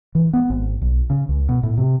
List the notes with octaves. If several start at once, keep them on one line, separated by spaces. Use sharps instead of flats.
E3
B3
G#1
B1
C#3
C#2
B2
A2
C3